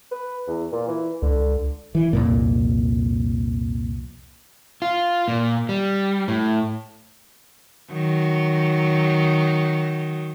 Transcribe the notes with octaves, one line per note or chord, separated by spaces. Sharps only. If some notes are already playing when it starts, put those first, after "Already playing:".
B4
E2
A#2
E3
C#2 D3
E3
C2 F2 A#2
F4
A#2
G3
A2
D#3 F#3